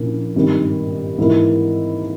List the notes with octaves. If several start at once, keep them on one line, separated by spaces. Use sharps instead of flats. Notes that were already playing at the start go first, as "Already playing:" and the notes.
Already playing: A#1 A#2 A#3 C#4 E4
G#1 G2 D#3
G#2 E3 A#3 E4